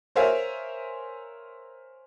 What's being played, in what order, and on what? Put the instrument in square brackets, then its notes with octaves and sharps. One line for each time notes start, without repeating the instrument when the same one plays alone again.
[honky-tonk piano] A#4 C5 C#5 E5 F5 G#5